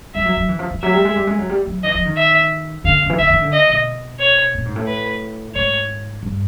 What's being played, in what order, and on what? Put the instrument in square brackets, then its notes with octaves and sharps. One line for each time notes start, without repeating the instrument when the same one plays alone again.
[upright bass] G3 [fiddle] E5
[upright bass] F#3
F#3
E3
F3
E3
[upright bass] F#3 [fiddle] E5
[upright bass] G3
G#3
G3
G#3
F#3
G3
F#3
[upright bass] E3 [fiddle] D#5
[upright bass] F3
D#3
[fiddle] E5
[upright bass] D3 [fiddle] F5
[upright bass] D3
E3
[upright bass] D#3 [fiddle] E5
[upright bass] D#3
D3
[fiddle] D#5
[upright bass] B2
[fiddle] C#5
[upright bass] A#2
G#2
A2
[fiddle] B4
[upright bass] G#2 [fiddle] C#5
[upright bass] G2